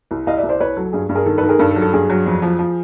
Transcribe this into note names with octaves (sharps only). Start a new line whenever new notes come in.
C2
C2 D#5 F5
D5 E5
C2
C5 D5
C2 B4 C#5
F#3 A4
G2 G#4
G2
G#4 A#4
D#3 A4
A4 B4
D#3
G#4 A#4
G2 A4
A4
F#3
A4
G2 G#4
F#3
F2
F3
F3